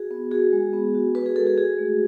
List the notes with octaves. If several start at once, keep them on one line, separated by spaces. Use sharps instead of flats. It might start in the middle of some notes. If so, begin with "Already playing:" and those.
Already playing: F#4 G#4
B3
F#4 G#4
G#3
B3
F#4
F#4 B4
G#4
G#3 A4
G#4
F#4 G#4
A3